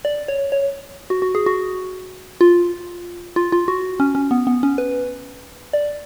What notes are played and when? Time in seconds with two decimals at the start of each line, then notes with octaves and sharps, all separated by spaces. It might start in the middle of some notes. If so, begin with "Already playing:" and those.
0.05 D5
0.28 C#5
0.52 C#5
1.10 F#4
1.22 F#4
1.35 G#4
1.46 F#4
2.41 F4
3.36 F4
3.52 F4
3.68 F#4
4.00 C#4
4.15 C#4
4.31 B3
4.47 B3
4.63 C#4
4.78 B4
5.73 D5